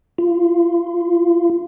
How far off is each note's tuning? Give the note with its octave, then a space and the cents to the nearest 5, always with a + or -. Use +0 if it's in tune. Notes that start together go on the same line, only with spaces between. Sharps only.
F4 -20